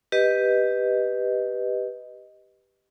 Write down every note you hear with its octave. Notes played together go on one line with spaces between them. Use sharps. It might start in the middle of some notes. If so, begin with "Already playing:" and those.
G4 B4 D#5